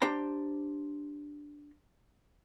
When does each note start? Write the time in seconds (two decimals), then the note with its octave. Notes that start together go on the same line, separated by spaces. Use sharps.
0.02 D4 G4 C5 A#5